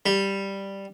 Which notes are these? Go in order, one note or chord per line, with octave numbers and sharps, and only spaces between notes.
G3